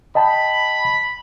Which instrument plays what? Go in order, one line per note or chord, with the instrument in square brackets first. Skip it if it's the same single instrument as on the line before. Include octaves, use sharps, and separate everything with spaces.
[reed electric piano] D#5 G5 A5 [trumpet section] B5